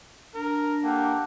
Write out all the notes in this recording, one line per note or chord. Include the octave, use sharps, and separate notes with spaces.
D4 A#4
A#3 G4 A4 F#5